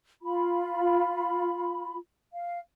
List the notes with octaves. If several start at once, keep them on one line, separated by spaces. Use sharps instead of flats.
F4 B5
F5